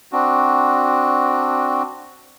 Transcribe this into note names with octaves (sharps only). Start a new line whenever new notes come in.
C4 D4 F#4